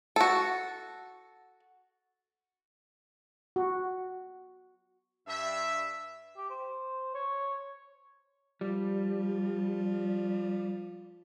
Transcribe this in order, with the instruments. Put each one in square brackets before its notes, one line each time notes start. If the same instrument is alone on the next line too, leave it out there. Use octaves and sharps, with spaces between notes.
[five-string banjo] F#4 A4
[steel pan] F#4
[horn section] G2 E5
[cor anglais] G4
C5
C#5
[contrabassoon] F3 [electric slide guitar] G3